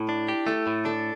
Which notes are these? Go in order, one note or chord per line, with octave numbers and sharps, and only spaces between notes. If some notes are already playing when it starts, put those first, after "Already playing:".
Already playing: A2 E4
D4
G4
A3 A4
A2
D4 A4